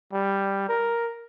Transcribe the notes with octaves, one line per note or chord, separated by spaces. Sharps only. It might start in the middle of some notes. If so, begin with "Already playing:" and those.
G3
A#4